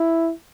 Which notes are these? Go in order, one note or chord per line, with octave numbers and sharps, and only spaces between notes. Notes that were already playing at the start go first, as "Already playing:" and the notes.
Already playing: E4